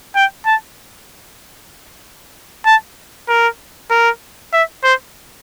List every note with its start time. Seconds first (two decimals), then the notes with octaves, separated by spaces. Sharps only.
0.16 G5
0.46 A5
2.66 A5
3.29 A#4
3.90 A#4
4.53 E5
4.84 C5